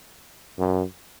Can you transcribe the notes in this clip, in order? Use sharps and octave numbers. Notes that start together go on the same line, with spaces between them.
F#2